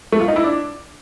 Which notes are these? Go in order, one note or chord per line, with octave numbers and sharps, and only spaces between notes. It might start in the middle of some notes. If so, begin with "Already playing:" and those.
A3
F4
D#4
E4
D4